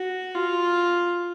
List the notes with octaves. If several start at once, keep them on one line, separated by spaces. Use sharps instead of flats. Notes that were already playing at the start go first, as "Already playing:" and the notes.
Already playing: F#4
F4